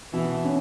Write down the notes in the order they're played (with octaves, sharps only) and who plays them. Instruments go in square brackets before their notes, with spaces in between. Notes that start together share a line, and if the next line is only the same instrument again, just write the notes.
[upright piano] B2 [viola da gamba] E3
[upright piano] C#4